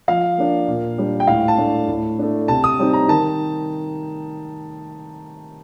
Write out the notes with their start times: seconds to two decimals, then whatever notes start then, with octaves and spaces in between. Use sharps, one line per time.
0.08 F3 F5
0.38 A#3 D4
0.68 A#2
0.98 G3 D4
1.20 G5
1.27 A2 F5
1.48 A5
1.58 A3 D4
1.88 A2
2.19 A3 D4
2.48 C3 A5
2.64 D#6
2.79 G3 C4 D#4
2.93 A#5
3.08 D#3 A5